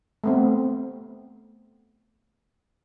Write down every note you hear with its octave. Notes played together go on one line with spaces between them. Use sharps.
A3 B3 C4